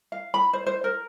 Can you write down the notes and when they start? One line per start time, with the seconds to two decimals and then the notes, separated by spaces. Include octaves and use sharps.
0.12 F5
0.34 B5
0.53 C5
0.66 C5
0.84 A#4